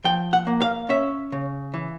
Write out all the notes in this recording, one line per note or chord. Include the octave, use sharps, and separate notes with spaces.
F3 G5
F#5
A#3
F5
C#4 E5
C#3
E3